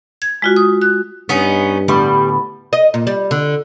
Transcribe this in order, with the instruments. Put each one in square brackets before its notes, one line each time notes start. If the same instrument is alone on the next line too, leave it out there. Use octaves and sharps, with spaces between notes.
[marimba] G#6
G#3 F4 F#4
D#6
F#6
[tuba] G2 [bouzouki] B3 C#4 D#4
[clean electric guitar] D2 A2 B3 [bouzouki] G3
[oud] D#5
A#2
G3
D3